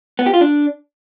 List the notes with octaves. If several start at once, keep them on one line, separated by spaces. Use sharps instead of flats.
B3
G4
F4
D4